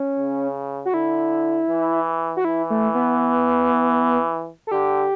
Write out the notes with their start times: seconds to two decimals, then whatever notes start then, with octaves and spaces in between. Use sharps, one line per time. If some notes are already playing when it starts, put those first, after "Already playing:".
Already playing: C#4
0.18 C#3
0.85 F#4
0.93 D3 E4
1.69 E3
2.37 F#4
2.45 E3 E4
2.70 A3
2.95 B3
4.67 A4
4.71 D3 G4